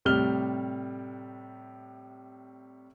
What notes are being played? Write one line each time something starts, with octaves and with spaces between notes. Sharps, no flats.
A2 C3 G3 F6 G7